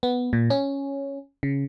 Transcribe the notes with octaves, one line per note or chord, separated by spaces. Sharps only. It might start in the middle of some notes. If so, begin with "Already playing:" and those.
B3
A#2
C#4
C#3